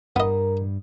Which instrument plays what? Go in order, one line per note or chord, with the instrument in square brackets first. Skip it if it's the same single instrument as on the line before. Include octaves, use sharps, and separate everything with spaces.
[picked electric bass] G2 [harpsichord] B3 D#5 [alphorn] A#4